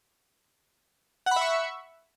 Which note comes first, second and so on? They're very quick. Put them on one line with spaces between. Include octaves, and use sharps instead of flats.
F#5 B5 E5 C#6